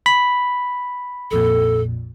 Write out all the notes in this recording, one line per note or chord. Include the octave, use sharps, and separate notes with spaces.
B5
A#1 F2 A#2 A4